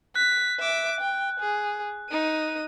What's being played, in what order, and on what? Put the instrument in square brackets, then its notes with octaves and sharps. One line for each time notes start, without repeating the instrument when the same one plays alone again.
[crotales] F#6 [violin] B6
[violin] E5 D6
G5
G#4
D#4 D#7